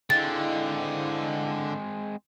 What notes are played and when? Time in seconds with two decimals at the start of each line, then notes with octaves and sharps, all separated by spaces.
0.10 D3 G#3 C4 E4 D#5 F5 A6